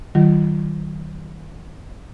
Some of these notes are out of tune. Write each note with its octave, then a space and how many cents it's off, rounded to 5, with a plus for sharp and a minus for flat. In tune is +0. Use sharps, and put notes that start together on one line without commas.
D#3 +0 F#3 +45 F4 -10